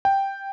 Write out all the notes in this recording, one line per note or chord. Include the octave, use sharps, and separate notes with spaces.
G5